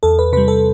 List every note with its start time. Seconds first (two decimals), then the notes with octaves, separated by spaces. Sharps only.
0.03 E2 A4
0.19 B4
0.33 C3 G3 B4
0.48 A4